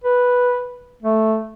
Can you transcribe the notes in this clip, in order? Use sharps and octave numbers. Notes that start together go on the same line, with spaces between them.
B4
A3